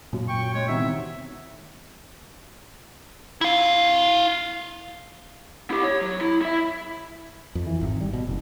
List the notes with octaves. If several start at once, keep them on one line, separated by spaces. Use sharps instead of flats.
F#2 A#2 A#3 C#4
G5 C#6
G#3 C#5
C3 D#3 E3 B3 E5
E4 F5
E4 G4
C#5
F#3
E4
E4 E5
F2
E3
G#1
G3
B2
F#1